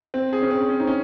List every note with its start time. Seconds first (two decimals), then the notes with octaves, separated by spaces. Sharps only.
0.14 C4
0.33 G#4
0.42 C#4
0.51 C4
0.69 C#4
0.80 D#4
0.87 C#4